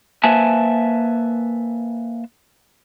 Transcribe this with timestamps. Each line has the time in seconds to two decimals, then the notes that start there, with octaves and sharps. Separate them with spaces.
0.24 A#3 B4 C5 E5 G#5 A5